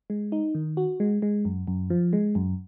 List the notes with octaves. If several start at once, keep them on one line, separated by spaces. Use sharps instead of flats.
G#3
D#4
D#3
F#4
G#3
G#3
F#2
F#2
F3
G#3
F#2